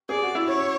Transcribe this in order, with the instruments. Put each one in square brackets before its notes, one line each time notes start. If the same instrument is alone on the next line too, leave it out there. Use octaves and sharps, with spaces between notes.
[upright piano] G#4 [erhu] D5
[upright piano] F#4
E4
[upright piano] C#4 [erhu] C#5